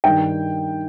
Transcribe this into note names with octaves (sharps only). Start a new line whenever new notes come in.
G2 D#3 G5